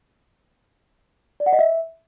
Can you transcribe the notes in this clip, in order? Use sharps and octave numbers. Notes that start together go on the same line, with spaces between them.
D5
F#5
D#5
E5